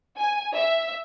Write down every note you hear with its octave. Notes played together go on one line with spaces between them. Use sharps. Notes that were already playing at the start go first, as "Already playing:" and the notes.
G#5
E5